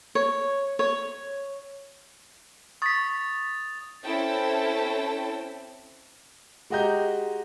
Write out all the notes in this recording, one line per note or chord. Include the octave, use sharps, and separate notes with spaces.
C#5
C#5
C#6 D#6 A6 B6
C4 C#4 E4 A4 G5 A5
G#3 F#4 G4 D#5 A#5 G6